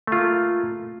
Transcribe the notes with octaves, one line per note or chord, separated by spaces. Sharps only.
A3 A#3 F4